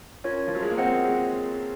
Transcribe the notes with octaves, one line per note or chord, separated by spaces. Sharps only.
C#4 F4 A#4 C#5
F3
F#3
G#3
A#3
C4 F4 C5 D#5 F#5
A#3
G#3